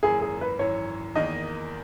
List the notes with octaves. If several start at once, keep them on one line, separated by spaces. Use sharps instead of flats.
G#1 F#2 E3 A#3 G#4
G#4
B4
G#1 F#2 E3 C#5
E2 D#3 A#3 D#5